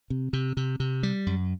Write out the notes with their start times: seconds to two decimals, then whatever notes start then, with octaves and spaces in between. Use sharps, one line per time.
0.10 C3
0.33 C3
0.57 C3
0.80 C3
1.03 G3
1.26 F#2